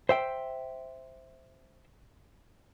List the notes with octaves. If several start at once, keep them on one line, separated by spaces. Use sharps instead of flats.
C5 E5 G5